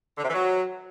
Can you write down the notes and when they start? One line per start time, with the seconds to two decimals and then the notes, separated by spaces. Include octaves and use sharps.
0.18 D3
0.23 C3
0.28 E3
0.34 F#3